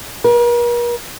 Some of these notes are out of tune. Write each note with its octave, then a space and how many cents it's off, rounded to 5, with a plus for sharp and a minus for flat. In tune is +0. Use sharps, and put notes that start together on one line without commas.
A#4 +45